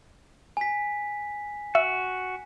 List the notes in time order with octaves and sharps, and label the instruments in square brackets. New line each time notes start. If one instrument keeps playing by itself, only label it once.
[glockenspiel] G#5 B6
[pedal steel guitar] F#4 [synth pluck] E5